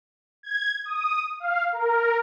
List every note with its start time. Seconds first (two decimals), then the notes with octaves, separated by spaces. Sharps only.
0.43 G#6
0.85 D#6
1.40 F5
1.72 A#4